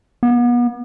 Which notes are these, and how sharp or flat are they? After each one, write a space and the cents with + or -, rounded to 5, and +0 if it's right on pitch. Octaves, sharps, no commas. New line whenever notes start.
B3 -35